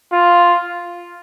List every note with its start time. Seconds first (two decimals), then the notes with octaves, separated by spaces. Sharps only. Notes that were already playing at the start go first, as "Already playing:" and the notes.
0.12 F4